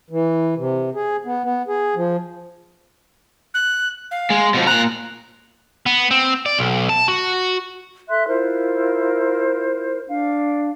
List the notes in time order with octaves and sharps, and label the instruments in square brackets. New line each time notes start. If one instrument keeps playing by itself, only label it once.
[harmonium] E3
C3
G#4
B3
B3
G#4
F3
[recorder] F#6
F5
[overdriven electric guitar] G#3
B2 F3
[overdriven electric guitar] A#2 A#5 [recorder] F#6
[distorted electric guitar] B3
C4
D5
B1
A5
F#4
[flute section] A4 E5 C6 F#6
E4 F4 A#4 C5
D4 F5